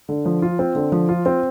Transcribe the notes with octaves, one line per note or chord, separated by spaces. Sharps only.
D3
F3
F4
C4
D3
F3
F4
C4